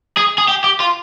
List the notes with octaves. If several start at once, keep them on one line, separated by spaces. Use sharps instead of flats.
G#4
G#4
G4
G4
F4